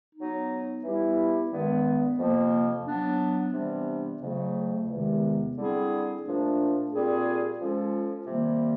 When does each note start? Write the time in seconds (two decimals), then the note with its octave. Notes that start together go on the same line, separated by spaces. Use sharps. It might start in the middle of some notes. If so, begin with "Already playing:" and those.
0.15 F#3 B3 D#4
0.83 E3 G3 B3 E4 G4
1.51 G2 D#3 G#3 B3
2.18 F2 C3 F3 A#3
2.86 F#3 B3 D4
3.53 C3 E3 G3 B3 D4
4.21 F2 C#3 F#3 A3
4.88 E2 C3 D#3 G#3 B3
5.56 D3 G3 C4 E4 G#4
6.23 A#2 F3 A3 D4
6.91 A#2 G3 C4 F4 G#4
7.58 F3 G#3 C#4 F4 A4
8.25 C3 D#3 G3 A#3